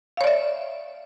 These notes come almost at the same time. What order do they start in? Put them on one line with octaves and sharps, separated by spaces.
F5 C#5 D5 E5